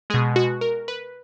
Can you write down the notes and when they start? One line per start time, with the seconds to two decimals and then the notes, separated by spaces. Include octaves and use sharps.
0.10 G#3 G#4
0.14 B2
0.36 F#4
0.61 A#4
0.88 B4